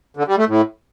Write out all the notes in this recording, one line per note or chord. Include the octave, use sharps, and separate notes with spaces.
D3
G3
A3
A2